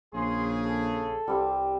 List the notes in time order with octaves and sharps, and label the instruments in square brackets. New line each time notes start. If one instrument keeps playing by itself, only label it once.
[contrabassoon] A#1 [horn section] C#3 G#4 [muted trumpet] C6
[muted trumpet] A4
[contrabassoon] C2 [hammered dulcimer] G3 C4